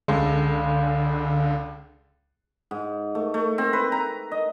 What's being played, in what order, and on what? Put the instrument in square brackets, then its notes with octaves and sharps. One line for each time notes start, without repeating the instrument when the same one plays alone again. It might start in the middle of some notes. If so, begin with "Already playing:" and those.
[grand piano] C#2 G#3 A4 [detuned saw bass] D3
[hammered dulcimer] G#2
A3
A3
C4
B4
A#5
D#5